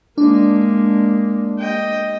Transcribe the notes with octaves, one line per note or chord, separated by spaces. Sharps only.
G#3 A#3 D4
D#5 G5